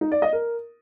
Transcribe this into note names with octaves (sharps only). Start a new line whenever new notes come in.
D#4
D5
D#5
A#4